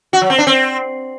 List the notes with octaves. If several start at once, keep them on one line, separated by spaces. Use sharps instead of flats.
F#4
F#3
C4
D4
C4